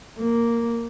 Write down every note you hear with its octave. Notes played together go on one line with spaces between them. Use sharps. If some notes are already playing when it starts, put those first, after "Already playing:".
A#3